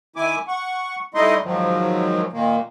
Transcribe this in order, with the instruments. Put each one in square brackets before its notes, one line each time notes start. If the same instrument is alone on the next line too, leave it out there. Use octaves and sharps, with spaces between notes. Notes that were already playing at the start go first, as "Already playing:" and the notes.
[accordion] D#3 E4 G#5 D6
F#5 C#6
G3 A3 D#4 E4 D#5 C6
G#2 D#3 F3 F#3
A#2 D#3 A#3